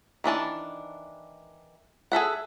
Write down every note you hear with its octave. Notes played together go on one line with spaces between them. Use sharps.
D#3 E3 D4 A5
G#4 A4 E5 F#5